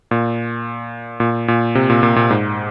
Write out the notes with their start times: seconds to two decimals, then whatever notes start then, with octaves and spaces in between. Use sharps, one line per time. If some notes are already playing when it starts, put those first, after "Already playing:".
0.11 A#2
1.20 A#2
1.48 A#2
1.75 C3
1.90 A#2
2.03 A#2
2.16 A#2
2.30 G#2